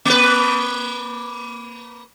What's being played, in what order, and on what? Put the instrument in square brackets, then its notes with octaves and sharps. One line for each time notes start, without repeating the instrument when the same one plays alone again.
[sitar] A#3 B4